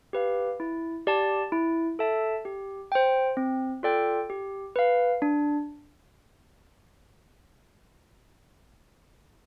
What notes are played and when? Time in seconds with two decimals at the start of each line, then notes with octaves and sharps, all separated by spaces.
0.13 G4 B4 F5
0.60 E4
1.07 G4 D5 A5
1.52 E4
1.99 A4 E5 A5
2.45 G4
2.92 C5 G5
3.37 C4
3.83 F4 A4 D5 G5
4.30 G4
4.76 B4 F5
5.22 D4